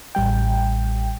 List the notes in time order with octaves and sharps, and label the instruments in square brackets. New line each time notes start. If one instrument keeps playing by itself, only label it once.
[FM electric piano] A1 G3 G5